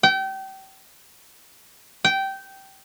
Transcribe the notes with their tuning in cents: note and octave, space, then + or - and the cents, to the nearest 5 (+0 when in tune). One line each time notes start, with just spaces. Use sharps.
G5 -30
G5 -15